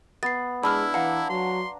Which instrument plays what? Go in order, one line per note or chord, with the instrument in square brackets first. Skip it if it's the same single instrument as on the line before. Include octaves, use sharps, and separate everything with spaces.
[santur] B3 [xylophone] A6 C7
[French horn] G#3 [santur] D4 [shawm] E4 [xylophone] B5 E6 F6
[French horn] E3 [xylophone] F5 F#5 [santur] A#5
[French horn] F#3 [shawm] C6